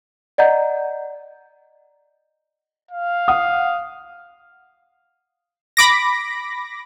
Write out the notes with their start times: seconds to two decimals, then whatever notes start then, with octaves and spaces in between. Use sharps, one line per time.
0.38 D5 D#5 F#5 A#5 G6
2.91 F5
3.28 F#5 D#6
5.77 B5 D6 A#6